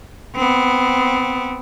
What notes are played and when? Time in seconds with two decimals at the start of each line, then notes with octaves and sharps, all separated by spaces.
0.35 B3 C4